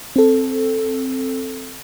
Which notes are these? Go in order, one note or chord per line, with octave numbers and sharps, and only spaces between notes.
C4 A4